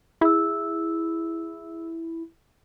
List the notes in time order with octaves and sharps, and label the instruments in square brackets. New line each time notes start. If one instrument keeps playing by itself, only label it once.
[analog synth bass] E4 [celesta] G#4 E6